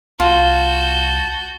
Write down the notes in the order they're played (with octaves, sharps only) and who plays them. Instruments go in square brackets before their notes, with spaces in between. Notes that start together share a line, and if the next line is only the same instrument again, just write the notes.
[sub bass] C2 [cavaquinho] F4 [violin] F#4 G6 [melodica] A5